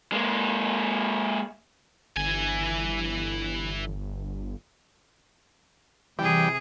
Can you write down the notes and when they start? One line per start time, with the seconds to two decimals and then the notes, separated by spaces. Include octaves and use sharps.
0.12 G#3 A#3
2.16 G1 E3 G#5
6.19 C3 E3 G3 G#4 G5